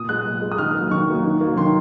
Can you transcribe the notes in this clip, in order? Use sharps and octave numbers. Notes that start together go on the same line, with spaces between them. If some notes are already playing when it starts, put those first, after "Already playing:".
Already playing: A#2 D#6
G#3 F#6
A#2
G#3
D#6
D#3 F6
F#3 A#3
D#3 C#6
F#3 A#3
D#3
F#3 A#3
D#3 C6